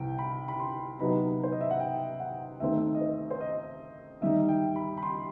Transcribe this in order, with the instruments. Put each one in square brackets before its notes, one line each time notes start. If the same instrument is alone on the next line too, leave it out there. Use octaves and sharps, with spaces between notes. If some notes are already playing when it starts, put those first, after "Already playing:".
Already playing: [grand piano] C2 C3 E3 G5
B5
B5
C6
C3 F#3 B3 D#4 B5
C5
D#5
E5
F#5
G5
F#5
D#2 D#3 A3 C4 E5
D#5
C5
C5
D#5
D#2 D#3 G3 D#4 E5
G5
B5
B5
C6